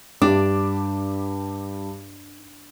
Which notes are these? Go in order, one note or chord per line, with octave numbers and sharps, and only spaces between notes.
G2 D4 G4 D6